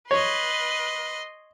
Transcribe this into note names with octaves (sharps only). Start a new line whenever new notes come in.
B4 C#5 D#5 C6